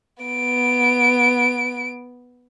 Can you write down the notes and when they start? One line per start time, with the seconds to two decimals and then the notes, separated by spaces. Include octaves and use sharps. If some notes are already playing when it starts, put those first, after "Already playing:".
0.23 B3 D7